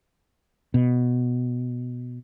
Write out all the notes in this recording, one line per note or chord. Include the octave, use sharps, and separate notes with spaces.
B2